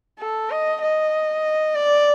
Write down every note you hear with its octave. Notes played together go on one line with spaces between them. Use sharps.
A4
D#5
D#5
D5